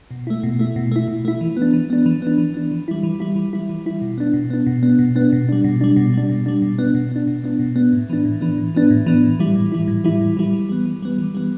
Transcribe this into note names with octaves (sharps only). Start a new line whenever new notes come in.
B2
A3 E4
B2
A3 E4
B2
A3 E4
B2
A3 E4
E3
B3
D4
E3
B3 D4
E3
B3 D4
E3
B3 D4
E3
G3 E4
E3
G3 E4
E3
G3 E4
E3
G3 E4
B2
B3 D4
B2
B3 D4
B2
B3 D4
B2
B3 D4
B2
G3 D4
B2
G3 D4
B2
G3 D4
B2
G3 D4
B2
B3 D4
B2
B3 D4
B2
B3 D4
B2
B3 D4
A2
E3 B3 D4
A2
E3 B3 D4
A2
E3 B3 D4
A2
E3 B3 D4
A2
E3 G3 E4
A2
E3 G3 E4
A2
E3 G3 E4
A2
E3 G3 E4
E3
G3 B3
E3
G3 B3
E3
G3 B3